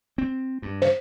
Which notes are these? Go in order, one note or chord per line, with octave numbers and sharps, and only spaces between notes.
C4
G2
C5